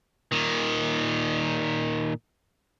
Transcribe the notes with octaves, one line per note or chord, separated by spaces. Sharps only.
A#2 D#3